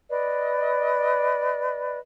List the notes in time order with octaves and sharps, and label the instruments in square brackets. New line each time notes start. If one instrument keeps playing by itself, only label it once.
[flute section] B4 D5 D#5